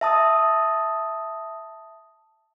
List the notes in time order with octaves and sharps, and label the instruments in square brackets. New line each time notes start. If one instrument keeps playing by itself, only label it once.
[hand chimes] E5 A5 D#6